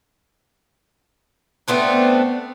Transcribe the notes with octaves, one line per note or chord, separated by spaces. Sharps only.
A3 B3 C4 D4